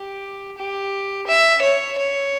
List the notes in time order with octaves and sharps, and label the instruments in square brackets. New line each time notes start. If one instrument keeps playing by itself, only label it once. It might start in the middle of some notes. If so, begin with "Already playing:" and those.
Already playing: [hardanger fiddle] G4
G4
E5
C#5
C#5